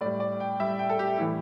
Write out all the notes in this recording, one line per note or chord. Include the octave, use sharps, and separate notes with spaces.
A2 G3 D5
D5
G5
A2 G3 E5
G5
A4
G4
A2 E3 G3 E4